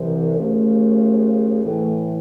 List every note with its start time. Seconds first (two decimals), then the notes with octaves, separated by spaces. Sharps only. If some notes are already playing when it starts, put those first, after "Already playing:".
Already playing: C2 C3 E3
0.36 D#2 C#3 F3 A3
1.64 A2 E3 A3